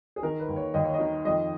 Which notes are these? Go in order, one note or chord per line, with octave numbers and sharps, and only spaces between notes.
G#4
D#3 A#4
B4
D#2
C#5
D#2 D#5
C#5
D#5
D#3
F2 D#5